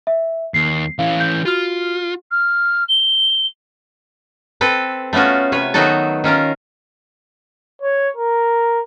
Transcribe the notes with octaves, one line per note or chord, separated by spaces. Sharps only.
E5
D#2 C7
E3 C#4 F5
G6
F4 F#4 F6
F6
G7
C4 A4 B4
A3 B3 C#4 F4 F#4
C3 B4 C#5
D#3 F#3 B3 D#4 F#4 A4
D#3 C#4 F4 A#4
C#5
A#4